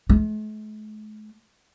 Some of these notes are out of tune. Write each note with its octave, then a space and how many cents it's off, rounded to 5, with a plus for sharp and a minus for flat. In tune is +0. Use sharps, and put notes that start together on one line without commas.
A3 -45